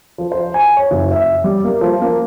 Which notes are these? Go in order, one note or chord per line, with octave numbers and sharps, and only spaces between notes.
F3
C5
G#5
C#5
F#1
E5
G3
A#3
F3
A#3